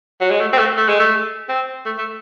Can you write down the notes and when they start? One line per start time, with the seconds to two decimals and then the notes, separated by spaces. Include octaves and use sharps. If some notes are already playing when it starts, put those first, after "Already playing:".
0.21 F#3
0.30 G#3
0.40 A3
0.53 C4
0.58 A3
0.77 A3
0.89 G#3
1.00 A3
1.49 C4
1.86 A3
1.98 A3